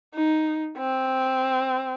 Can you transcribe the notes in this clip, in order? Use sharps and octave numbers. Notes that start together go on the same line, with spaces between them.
D#4
C4